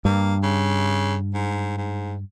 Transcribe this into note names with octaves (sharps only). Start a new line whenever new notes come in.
G2 A#3
C#3
G#2
G#2